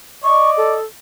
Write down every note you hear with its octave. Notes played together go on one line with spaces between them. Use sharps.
D5 D#5 C#6
A4